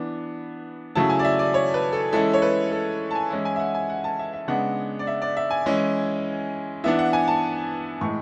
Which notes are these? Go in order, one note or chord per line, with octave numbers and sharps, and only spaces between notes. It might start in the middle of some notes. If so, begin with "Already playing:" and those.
Already playing: E3 B3 D4
C#3 F#3 A3 E4 A5
G#5
D5
E5
D5
C#5
B4
A4
E3 G#3 C#4 E4 A4
C#5
B4
A4
A5
G#5
E3 G#3 C#4 E4
G#5
E5
F#5
G#5
F#5
A5
E5
E5
C#3 G#3 B3 D4 F#5
D5
E5
D5
E5
G#5
E3 G#3 C#4 E4
E3 B3 D4 E5
F#5
G#5
A5
A2 E3 G#3 C#6